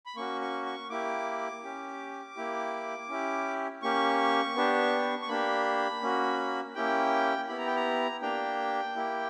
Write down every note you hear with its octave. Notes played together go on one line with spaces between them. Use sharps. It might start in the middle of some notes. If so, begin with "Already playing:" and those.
B5
A#3 C#4 F#4 C#6
C#6
C#6
A#3 E4 G4 D6
C#4 G4
A#3 E4 G4
C#4 E4 G4
A#3 C#4 G4 C#6
B3 D4 G4
C#6
A#3 D4 G4 B5
A#3 C#4 F#4
A#3 C#4 E4 G4 G5
B3 E4 G4 B5
A#5
G5
A#5
A#3 D4 G4 G5
A#3 E4 G4